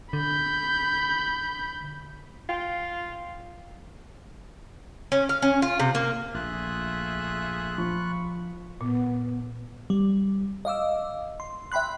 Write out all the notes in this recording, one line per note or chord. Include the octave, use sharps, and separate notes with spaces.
D3 B5 G6
F4 F5 G5 C6
C#4
F5
C#4
F4
C3
A#3
A#1 A3 F4 G#4 E5 F#6
F3 B5 C#6
A#2 B3
G3
D#5 F5 D6 E6
C6
E5 G5 B5 C6 F#6